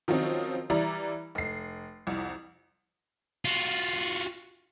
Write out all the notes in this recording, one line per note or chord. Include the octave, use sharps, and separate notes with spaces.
D#3 F3 F#3 C4 C#4 D#4
E3 G3 E4 D5 A#5
F1 C7
C2 F2
F4 F#4